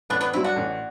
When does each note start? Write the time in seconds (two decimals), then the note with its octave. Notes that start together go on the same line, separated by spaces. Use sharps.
0.10 A1 B3 D4
0.21 B3 D4
0.33 G2 F#3 C4 E4
0.44 D4 F#4
0.56 A1